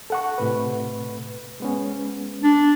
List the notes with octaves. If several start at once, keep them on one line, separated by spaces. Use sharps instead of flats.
A4 F#5 C#6
A2 C3 B4
G#3 B3 C#4
D4